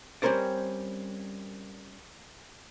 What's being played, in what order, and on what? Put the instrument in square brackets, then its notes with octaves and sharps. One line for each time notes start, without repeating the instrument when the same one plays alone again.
[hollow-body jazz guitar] G3 C4 C#4 A#4 C5 D5